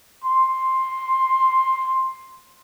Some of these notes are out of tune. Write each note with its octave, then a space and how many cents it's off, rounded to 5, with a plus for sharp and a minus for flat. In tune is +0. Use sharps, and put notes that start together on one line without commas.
C6 +10